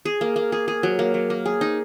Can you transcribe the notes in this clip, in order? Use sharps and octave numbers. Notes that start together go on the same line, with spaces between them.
G#4
A#3
A#3
G#4
G#4
F#3
A#3
F#3
A#3
G#4
D#4